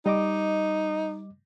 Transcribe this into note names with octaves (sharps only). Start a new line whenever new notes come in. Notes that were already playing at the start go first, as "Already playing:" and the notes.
G3 D#4 D#5 D6